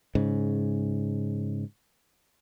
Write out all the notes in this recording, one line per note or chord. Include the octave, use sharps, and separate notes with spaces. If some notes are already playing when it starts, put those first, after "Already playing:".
G#2 C#3